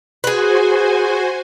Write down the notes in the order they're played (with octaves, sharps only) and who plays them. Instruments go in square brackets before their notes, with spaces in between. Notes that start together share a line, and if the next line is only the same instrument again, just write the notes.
[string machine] F#4 C5 G#5 [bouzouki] G#4 B4